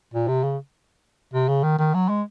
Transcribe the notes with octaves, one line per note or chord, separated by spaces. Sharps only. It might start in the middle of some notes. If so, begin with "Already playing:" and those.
A#2
C3
C#3
C3
C#3
D#3
D#3
F#3
G#3